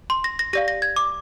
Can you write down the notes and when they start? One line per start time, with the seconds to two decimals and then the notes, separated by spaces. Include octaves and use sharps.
0.10 C6
0.24 A#6
0.39 A#6
0.53 G4 D5 F5 A#6
0.68 A#6
0.82 G#6
0.96 D6